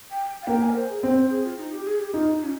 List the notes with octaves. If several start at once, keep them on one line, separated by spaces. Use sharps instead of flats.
G5
F5
A#3 G5
G#5
A#4
C5
G#4
C4 C5
C5
G#4
F4
D#4
G4
G#4
G4
D#4 F4
D#4
C#4